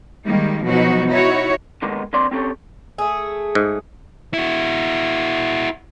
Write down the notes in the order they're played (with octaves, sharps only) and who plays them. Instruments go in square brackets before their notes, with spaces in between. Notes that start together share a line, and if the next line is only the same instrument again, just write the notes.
[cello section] D#3 G3 G#3 A#3 D#4
B2 F3 F#3 D#4 F#4
D#4 E4 F#4 C#5
[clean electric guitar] D3 D#3 G#3 A#3 B3 D#4
F2 A#3 C4 D4 D5 C6
C4 C#4 G4 A4 C#5
[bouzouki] A3 G#4
[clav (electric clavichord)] G#2
[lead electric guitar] E4 F#4